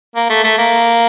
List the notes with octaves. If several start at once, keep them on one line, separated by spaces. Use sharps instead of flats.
A#3
A3
A3
A#3